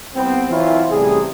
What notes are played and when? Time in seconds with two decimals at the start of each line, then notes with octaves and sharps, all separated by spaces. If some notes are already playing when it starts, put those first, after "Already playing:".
0.14 C2 B3 C4
0.50 E3 F#3 C4 E4 F4
0.91 A1 C3 G3 G#4